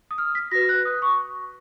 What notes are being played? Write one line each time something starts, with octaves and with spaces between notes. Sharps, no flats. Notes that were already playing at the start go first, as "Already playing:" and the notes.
D#6
F6
B6
F#4 B4 A#6
F#6
D#6
C#6